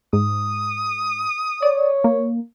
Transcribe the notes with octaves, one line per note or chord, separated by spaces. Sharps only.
G#2 D#6
C#5 D5
A#3